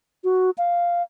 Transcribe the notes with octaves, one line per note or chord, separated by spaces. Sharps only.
F#4
F5